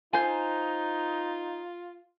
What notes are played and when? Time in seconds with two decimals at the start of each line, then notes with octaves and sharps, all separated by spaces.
0.13 D#4 F4 C5 G#5